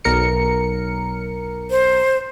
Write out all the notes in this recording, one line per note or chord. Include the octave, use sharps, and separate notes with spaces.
B1 A#4 C#7
C5